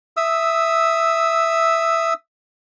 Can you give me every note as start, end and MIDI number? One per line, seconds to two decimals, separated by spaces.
0.17 2.13 76
0.17 2.13 87
0.17 2.13 88